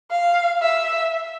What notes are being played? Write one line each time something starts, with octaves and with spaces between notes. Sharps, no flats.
F5
E5